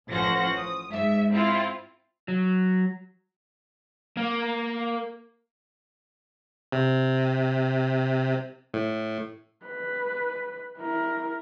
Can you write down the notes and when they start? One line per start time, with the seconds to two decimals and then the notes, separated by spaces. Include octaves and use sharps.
0.10 A1 F3 C#4 C5 F#5 A#6
0.56 D#6
0.91 G#2 E5
1.31 C4 E4 F4
2.28 F#3
4.17 A#3
6.72 C3
8.74 A2
9.66 B4
10.78 E4 A#4